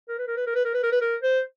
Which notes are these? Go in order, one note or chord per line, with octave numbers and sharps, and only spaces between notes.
A#4
B4
A#4
B4
A#4
B4
A#4
B4
A#4
B4
A#4
C5